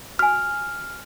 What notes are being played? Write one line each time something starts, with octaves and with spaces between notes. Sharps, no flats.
F#4 G#5 F6